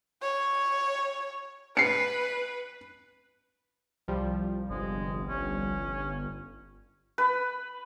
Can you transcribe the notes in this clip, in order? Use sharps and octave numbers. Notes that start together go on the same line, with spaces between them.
C#5
B4 C7 C#7
C2 F3 G3
G1 G#3
C#4
B4